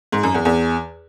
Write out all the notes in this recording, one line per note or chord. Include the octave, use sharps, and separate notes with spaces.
G#2
F#2
E2
E2